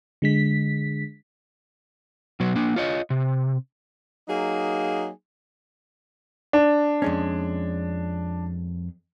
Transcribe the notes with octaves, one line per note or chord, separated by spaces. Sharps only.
D3 G#3 B6
B2 F#3
A#3 D4
F4 C#5 D#5
C3
F#3 A#3 D#4 G#4
D4
F2 G#3 C#4